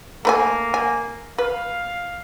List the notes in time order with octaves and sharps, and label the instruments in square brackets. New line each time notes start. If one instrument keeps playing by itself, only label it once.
[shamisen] A3 B4 G#5 [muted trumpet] A#3
[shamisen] G#5
[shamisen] B4 [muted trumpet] F5